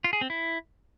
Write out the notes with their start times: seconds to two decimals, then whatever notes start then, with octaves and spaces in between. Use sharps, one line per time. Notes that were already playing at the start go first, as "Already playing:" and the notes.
0.04 F4
0.13 G#4
0.21 C4
0.30 E4